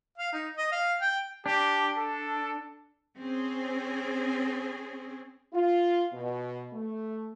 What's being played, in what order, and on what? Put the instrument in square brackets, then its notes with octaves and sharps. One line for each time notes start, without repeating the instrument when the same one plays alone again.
[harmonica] F5
D#4
D#5
F5
G5
[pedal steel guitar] D4 [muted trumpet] G4
[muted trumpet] A4
[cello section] C4 C#4 G#4
[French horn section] F4
B2
A3